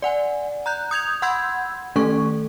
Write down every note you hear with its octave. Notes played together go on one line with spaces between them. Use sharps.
D5 F#5 G#5
A#5 F#6 G6
D#6 G6 G#6 F7
F#5 B5 C6 E6 G6 G#6
D#3 A3 C#4 A4 C#6